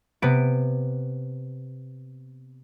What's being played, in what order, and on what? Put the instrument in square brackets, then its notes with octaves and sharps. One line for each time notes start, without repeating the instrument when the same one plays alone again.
[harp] C3 B3 D7